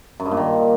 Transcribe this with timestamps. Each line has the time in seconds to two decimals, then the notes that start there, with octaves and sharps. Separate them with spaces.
0.20 F#2
0.25 G2
0.31 A#2
0.37 D#3